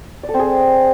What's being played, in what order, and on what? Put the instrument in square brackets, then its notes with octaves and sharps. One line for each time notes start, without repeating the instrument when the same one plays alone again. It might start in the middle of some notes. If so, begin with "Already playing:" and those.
[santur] D5
A4
C4
G#4